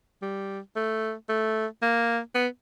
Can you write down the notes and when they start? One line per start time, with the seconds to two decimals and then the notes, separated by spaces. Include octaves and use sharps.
0.22 G3
0.76 A3
1.29 A3
1.82 A#3
2.35 B3